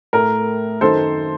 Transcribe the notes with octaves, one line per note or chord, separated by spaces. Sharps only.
A2 A3 A#4
F#2 D#3 F#3 A4 C5